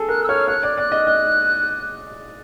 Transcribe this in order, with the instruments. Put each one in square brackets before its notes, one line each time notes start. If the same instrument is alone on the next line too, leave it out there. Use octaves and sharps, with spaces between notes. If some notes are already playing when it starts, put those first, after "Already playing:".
Already playing: [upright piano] G#4 A4
[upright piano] A#4 [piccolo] F#6
[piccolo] E6
[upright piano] C#5 [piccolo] F6
[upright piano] C#5 [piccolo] F#6
[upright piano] D5
[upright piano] D5 [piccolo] F#6
[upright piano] D#5
[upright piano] D#5 [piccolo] F#6